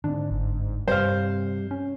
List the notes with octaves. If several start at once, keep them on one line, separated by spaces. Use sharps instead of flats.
G#2 D3 C4 D4
G1
G2 C3 G3 C4 C5 F5
C#4